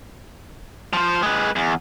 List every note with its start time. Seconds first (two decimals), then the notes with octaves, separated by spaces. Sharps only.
0.93 F3 C5
1.23 G#3 B4
1.56 E2